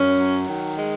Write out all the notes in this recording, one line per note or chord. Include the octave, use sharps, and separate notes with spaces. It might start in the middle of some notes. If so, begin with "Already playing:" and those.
Already playing: F#2 C#4
F#3
D#3
G#3